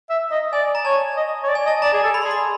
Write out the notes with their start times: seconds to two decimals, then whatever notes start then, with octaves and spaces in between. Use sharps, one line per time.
0.10 E5
0.31 D#5
0.53 D5 G#5
0.75 A#5
0.85 C#5 A5
1.17 D#5
1.43 C#5
1.49 D5
1.55 G#5
1.66 D#5 A5
1.82 D5 A#5
1.93 G#4
2.03 A4
2.14 B5
2.22 G#4 C6
2.31 B5